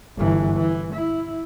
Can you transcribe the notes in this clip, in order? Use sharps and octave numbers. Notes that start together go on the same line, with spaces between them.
G1 E3
E3
E4